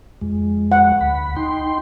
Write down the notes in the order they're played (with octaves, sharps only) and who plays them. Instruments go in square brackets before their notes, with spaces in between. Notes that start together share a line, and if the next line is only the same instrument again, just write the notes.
[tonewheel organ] F2 G#3
[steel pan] F#5
[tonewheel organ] D2 B5
D#4 G5 C6